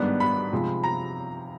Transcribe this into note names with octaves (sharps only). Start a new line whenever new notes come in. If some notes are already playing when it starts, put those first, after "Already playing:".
Already playing: G#2 D#3 G3 B3 D4
B5
C3 F3 G#3
A#5